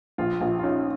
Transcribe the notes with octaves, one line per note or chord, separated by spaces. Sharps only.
A#1 F4
A#1
F4
C#4 D#4